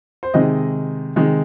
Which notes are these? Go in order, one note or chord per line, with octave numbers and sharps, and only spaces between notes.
C5
C3 D#3 G#3 D#5
C3 D#3 G#3